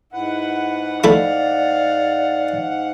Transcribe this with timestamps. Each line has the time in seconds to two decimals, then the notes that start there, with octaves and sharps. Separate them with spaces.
0.13 G#2 E4 B4 F#5
1.04 A3 E4 D5 F5